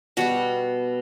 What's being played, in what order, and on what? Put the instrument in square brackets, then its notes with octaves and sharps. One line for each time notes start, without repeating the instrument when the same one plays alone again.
[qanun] B2 G3 B3 F#4